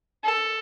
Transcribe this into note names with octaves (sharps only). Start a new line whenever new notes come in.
A4